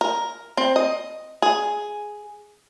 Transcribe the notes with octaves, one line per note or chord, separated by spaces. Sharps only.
A#4
C4
D#5
G#4